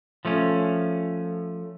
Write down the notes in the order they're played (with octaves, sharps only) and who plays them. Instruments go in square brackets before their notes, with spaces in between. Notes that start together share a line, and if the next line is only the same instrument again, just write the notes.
[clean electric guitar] F3 A3 C#4